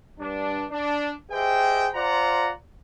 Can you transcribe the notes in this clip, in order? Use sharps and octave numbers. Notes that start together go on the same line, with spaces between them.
G2 D4
D4
G4 G#4 C5 D#5 E5 G5
F4 C5 D5 F#5 A#5